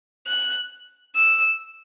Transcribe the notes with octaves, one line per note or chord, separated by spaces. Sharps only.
F#6
E6